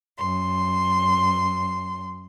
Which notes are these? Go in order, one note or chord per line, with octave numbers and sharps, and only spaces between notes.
F#2 C6